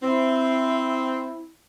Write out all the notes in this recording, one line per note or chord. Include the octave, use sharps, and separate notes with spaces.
C4 E4